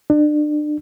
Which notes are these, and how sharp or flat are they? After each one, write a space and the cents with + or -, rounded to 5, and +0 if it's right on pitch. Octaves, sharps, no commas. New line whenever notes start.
D4 +35